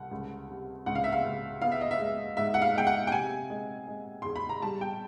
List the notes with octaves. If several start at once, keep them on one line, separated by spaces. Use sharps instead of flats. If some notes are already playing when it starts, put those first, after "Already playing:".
Already playing: C2 F#5
C#2
C3
C#2 F#5
F5
E5
F5
C#2
B3 F5
E5
D#5
E5
G#3
G#2 E5
F#5
F5
G#3 G5
F#5
G5
C3 G#5
G#3
G#3
E2 C6
B5
A#5
G3 A5
G5